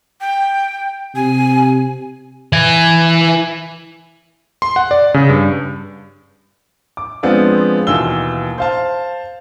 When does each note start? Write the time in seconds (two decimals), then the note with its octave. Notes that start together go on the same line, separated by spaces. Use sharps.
0.21 G5
1.15 C3 G#5
2.53 E3 G#5
4.62 C6
4.76 F#5
4.91 D5
5.14 C#3
5.29 G2
6.97 D6
7.23 F3 G#3 B3 C4 D4 F4
7.87 D#2 B2 E3 F4 E6 G7
8.58 C5 F5 A5